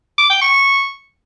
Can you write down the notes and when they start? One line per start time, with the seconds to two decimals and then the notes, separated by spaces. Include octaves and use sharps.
0.18 D6
0.30 G5
0.42 C#6